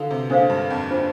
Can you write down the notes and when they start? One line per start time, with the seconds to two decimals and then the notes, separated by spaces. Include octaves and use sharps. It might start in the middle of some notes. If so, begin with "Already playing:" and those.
Already playing: D3 E3 A4 F5
0.11 C3
0.30 A#2 D4 A4 C5 F5
0.50 G2
0.70 F2
0.91 D4 F4 C5